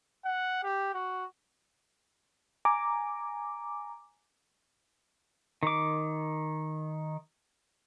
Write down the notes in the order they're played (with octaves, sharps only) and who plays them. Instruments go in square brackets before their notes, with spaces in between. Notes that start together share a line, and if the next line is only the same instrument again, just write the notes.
[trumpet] F#5
G4
F#4
[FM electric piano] G#5 A#5 D6
[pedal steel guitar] D#3 D6